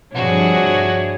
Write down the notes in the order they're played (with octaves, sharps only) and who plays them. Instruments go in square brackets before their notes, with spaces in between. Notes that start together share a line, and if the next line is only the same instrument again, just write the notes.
[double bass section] G2 C3 F3 [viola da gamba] D4 E4 G#4 [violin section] F#4 [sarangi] C#5